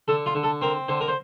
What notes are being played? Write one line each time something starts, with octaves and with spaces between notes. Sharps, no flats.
D3 A4
F4
D3
A4
C4 A#4
D3 C5
A#4
C5